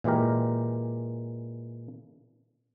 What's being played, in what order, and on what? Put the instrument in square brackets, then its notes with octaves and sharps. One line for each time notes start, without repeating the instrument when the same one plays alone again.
[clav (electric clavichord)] A#2 E3 G#3 G4 A#4